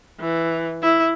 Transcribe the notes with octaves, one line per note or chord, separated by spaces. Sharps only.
E3
E4